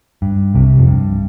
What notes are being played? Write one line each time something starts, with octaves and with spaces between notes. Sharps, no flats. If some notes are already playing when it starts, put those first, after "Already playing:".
G2
C2 C3
F2
G2